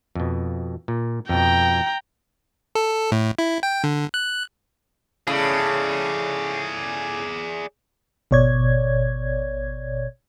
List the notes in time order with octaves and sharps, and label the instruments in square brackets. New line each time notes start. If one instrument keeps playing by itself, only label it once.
[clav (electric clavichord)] F2 B2
A#2
[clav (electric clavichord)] F2 B2 [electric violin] G5 A#5
[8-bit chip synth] A4
A2
E4
G5
D3
F#6
[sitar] A2 C#3 [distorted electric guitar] G#4 D5
[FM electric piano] G#1 B2 C#5 D5 G#6